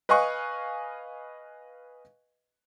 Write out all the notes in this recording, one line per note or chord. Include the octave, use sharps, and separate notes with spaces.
B4 D#5 F5 G#5 C#6 F#6